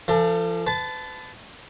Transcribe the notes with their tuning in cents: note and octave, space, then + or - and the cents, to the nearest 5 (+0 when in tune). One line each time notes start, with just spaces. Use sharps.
F3 -35 A4 +25
B4 +35 A5 -10